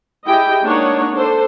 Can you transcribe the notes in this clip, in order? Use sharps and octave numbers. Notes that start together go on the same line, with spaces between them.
E4 G4 G#4 D#5 G5
G#3 A#3 D4 D#4 C#5 F#5
D4 A4 C5